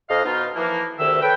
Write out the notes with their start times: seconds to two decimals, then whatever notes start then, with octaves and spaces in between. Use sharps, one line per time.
0.09 F2 D#5 F5
0.25 B2 D#4 F4
0.55 E3 F3 A#3
0.99 D2 C3 D#3 E5 E6
1.22 A4 B4 C#5 G5